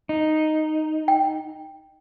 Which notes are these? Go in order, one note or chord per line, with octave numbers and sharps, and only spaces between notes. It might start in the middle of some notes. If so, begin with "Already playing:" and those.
D#4
G5